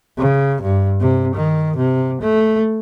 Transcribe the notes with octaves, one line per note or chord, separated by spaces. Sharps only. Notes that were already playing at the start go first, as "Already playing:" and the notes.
C#3
G2
C3
D#3
C3
A3